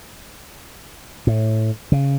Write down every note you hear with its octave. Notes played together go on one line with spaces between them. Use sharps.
A2
C#3